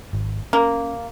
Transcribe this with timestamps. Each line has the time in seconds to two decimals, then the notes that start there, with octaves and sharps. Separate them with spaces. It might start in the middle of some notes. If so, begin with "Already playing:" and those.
0.13 G#1
0.53 A#3 C#4